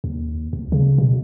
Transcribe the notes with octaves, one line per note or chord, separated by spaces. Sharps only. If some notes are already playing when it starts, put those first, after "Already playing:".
D#2
D2
C#3
B2